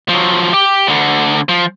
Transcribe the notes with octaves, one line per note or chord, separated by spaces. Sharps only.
F3 F#3
G4
D2 D3
F3